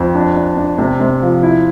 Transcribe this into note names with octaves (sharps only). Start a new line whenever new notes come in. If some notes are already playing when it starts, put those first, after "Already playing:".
Already playing: F2
D4
D4
D4
C3
C3
F3
E4